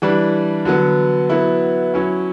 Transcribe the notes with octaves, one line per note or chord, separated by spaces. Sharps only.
E3 G3 D4
D3 F#3 B3
F#3 B3 E4
F#3 C#4 E4